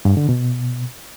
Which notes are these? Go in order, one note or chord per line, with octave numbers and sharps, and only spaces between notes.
G2
D3
B2